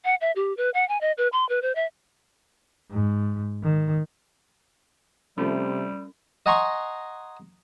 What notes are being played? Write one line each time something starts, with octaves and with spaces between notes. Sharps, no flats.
F#5
E5
G4
B4
F#5
G#5
D#5
B4
C6
B4
C5
E5
G#2
D#3
C3 F3 G3 A3 C#4
D#5 F#5 G#5 A#5 C6 C#6